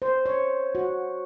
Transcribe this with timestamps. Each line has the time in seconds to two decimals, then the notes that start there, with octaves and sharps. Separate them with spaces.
0.02 C5
0.26 C#5
0.75 F#4